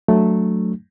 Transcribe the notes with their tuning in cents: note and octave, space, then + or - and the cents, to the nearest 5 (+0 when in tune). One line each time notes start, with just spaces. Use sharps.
F#3 +0 A3 +0 D4 +0